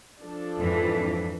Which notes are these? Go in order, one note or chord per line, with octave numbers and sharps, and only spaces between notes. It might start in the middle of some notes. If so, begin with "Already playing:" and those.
F3 D4 A4
F2 G#2 E3